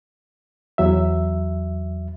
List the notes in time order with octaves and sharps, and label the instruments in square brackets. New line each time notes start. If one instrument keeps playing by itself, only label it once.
[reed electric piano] E2 F#3 E5